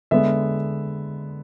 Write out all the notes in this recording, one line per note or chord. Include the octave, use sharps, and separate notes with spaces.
D3 G#3 B3 E5